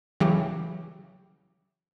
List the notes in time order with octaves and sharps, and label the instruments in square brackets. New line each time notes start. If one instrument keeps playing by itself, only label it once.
[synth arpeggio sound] C#3 E3 F#3 G4